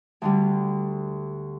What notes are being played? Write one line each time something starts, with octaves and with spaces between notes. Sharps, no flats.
D2 D3 G3